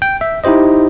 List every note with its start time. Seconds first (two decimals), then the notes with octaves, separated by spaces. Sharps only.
0.02 G5
0.21 E5
0.44 D#4 E4 G4 C5 D#5